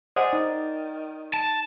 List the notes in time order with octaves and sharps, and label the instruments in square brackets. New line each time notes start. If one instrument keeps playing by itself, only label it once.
[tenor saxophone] G#4 [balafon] C5 D#5 F#5 [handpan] D5
[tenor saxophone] D#3 [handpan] D#4
[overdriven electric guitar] A5